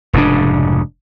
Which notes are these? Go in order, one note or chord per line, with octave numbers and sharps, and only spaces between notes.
F1 G#2 C#3 D4